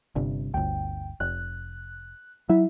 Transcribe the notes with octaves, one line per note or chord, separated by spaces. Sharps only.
G1 G2 C3
G1 D2 G5
F1 F#6
F#3 E4 E5